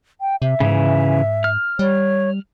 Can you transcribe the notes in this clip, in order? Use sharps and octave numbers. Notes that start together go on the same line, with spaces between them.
G5
C3 E5
G#2 C#3 E3
F6
G3 C#5